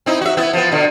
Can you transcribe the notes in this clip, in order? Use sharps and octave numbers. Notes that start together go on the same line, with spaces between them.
C4 D#4 E4
F#4 E5
B3 E4
F3 B3
B2 D3